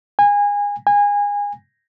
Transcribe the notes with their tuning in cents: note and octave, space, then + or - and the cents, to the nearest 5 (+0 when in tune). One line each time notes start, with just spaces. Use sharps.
G#5 -25
G#5 -25